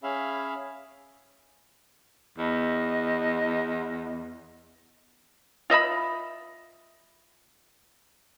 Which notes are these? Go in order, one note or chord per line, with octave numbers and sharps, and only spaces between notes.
C#4 G#4 E5 F5 B5
E2 D#5
F4 D#5 E5 B5